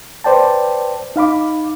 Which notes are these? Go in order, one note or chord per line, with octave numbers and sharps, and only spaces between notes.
B4 C5 D5 G5 A5
D#4 F5 B5 D6